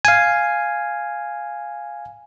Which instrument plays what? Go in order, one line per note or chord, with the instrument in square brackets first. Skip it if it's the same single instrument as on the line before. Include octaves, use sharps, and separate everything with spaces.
[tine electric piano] F5 G#5